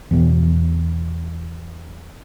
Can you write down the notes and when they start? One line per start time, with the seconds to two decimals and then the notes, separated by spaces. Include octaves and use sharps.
0.11 E2 B2